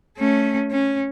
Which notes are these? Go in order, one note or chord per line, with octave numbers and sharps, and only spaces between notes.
A3 C#4
C#4